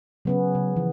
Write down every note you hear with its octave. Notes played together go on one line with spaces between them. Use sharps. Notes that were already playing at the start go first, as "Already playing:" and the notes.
C#3 F#3 B3 C#4
C#3
E3 F3